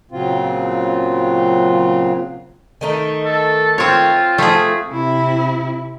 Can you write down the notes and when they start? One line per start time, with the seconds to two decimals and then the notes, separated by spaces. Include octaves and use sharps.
0.11 A#2 C#3 F#3 C4 F4
2.81 D#3 A3 D#4
3.26 A4
3.78 C4 F4 C#5
4.38 F3 A3 G#4 F5
4.90 C3 E4